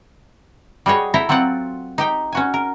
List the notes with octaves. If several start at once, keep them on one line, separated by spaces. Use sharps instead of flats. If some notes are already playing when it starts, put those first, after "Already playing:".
G3 F#4 G#4 C#5 D#5
E4 A4 E5 G5 A#5
F#3 C4 F4 D5 F#5
D#4 G4 G5
C#4 F#4 G#5
A#4